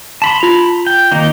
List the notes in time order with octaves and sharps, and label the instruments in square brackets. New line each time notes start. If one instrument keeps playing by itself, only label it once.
[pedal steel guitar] A5 B5 C6
[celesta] F4 F7
[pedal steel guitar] G5
D#3 A#3 D#4